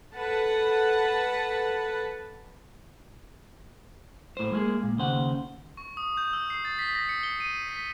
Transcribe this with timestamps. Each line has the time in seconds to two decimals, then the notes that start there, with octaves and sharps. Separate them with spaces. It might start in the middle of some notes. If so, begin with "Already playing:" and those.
0.14 A4 B4 F#5 A5
4.37 A2 C5
4.52 G#3 A#3 G#4
4.83 A#2
4.98 D#2 C#3 C5 F#5
5.77 C#6
5.97 D#6
6.17 G6
6.33 E6
6.50 C7
6.65 A6
6.79 B6
6.95 A#6
7.09 C#7
7.23 G7
7.40 D#7
7.69 B6